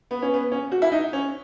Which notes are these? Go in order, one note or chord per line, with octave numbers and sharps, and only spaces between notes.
B3
C#4
B3
C#4
F#4
E4
D#4
C#4